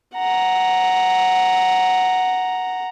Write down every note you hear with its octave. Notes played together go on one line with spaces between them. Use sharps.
F#5 A#5